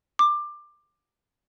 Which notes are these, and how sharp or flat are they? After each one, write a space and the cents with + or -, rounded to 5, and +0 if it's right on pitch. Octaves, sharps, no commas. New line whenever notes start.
D6 +20